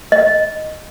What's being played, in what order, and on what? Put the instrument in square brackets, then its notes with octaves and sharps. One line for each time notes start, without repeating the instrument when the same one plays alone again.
[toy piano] D#5